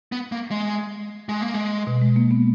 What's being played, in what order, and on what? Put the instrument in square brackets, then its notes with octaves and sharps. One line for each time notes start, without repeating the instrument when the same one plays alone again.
[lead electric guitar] B3
A#3
G#3
G#3
A#3
G#3
[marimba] B2
G#3
A#3
B3